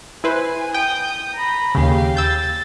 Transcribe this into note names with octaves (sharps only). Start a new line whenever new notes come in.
E4 B4 C5 G#5
G5 D#6 G6
A#5 B5
D#2 C#3 G4 F5
E6 G6 A6